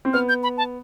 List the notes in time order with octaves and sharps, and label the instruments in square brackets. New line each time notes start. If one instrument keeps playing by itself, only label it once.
[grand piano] C4
[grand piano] B3 [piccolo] F6
[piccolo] G6
B5
A5